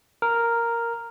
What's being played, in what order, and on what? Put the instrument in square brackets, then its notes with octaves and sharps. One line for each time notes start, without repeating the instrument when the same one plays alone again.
[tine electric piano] A#4